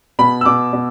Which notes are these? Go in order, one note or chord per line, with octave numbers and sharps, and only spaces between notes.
B2 B5
E6
B2 D6
B2